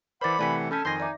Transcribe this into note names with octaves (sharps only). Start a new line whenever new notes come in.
E3 A#4 C5 D5 F#5 B5 D6 A6
C3 E3 A3 D5 F#5 G#5 B6
C#4 A4 G#5 A5 B5 G6 B6
F2 D#3 G#5 C6 G6 G#6 A#6
D#4 D5 E5 D6